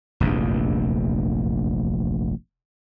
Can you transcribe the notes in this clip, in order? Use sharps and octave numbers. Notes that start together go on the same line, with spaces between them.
F1 A#1 E2 G2